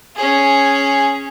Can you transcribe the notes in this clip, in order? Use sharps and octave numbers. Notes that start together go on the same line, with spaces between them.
C#4 G#4